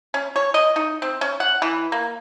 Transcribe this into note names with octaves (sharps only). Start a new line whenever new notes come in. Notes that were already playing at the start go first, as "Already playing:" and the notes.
C#4
C#5
D#5
D#4
C4
C#4
F#5
E3
A#3